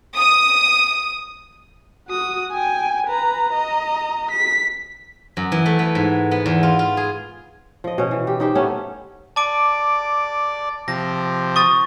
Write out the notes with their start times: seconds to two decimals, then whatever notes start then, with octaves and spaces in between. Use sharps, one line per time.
0.17 D#6
2.08 F#4 D#6
2.52 G5 G#5
3.06 B4 A#5
3.52 D#5 A#5
4.31 B6
5.37 F#2
5.52 E3
5.66 A3
5.79 B3
5.95 G#2
6.31 B3
6.46 E2
6.63 F4
6.79 F4
6.97 G#4
7.84 F3 D#5
7.98 B2 C#4
8.11 E3
8.27 G4
8.40 D#4 G4 C5
8.55 A3 B3 C#4
9.36 D5 A5 D6 D7
10.88 C3 F3 A#6
11.56 C#6 D#6 A6